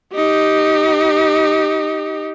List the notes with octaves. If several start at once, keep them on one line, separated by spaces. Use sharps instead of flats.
D#4 G4